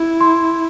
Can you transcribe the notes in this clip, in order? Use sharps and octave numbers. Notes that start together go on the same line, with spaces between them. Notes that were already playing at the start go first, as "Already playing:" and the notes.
Already playing: E4
C6